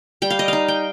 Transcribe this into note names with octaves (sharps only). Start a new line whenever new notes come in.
G3 G5
F5
D#5
D#4 F5
G5